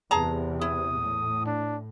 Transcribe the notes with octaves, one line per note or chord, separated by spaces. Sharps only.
E2 C3 G#4 A5 A#5
E4 D#6
A2
D4